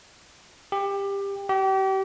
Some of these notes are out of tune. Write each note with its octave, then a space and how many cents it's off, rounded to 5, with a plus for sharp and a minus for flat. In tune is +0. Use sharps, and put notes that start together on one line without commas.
G4 +20
G4 -35